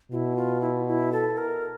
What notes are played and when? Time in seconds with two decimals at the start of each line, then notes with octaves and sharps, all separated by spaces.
0.12 B2 F4
0.15 E4
0.36 F4
0.61 E4
0.87 E4
1.12 A4
1.38 A#4